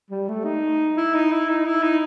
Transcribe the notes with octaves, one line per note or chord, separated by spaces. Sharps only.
G3
A3
D#4
E4
D#4
E4
D#4
E4
D#4